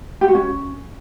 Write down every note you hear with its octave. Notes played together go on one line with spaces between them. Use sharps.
G4
F#4
C#4